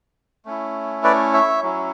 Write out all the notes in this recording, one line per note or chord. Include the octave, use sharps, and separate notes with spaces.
A3 C#4 E4
B4 D5
C#5 E5
F#3 C#4 E4